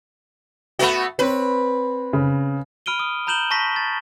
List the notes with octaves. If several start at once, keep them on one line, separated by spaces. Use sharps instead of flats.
A3 B3 F#4 E5 F#5 B5
C4 B4 C#5
C#3
B5 F6 D7 D#7 G7
D#6
A#5 B5 G6 E7 F#7 G7
A5 C#6 A#6 B6
A6